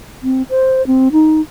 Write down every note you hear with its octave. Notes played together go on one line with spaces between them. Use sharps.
C4
C5
C4
D#4